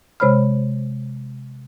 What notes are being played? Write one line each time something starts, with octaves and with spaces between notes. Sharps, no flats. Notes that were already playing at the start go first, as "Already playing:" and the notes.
C3 G#3 C5 C#5 B5 F6